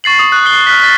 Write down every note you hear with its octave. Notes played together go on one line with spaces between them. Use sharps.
C#6 A6 C7 F#7
D#6
D#6 F#6
C7 G7
F6 F#6 B6
A6 B6 G7